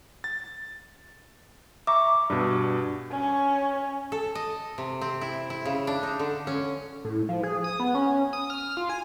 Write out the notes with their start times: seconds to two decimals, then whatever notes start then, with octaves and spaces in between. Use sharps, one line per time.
0.24 A6
1.87 E5 A#5 C#6 D6
2.30 G2 B2 D4
3.11 C#4 C#5
4.12 A4
4.35 D#5
4.78 C3
5.01 C4
5.21 E4
5.50 E4
5.66 C#3
5.87 D4
6.03 D#4
6.19 D3
6.47 C#4
7.05 A2
7.29 F3
7.43 G#4
7.64 D#6
7.80 B3
7.95 C#4
8.33 D#6
8.50 F6
8.77 F4
8.89 G#5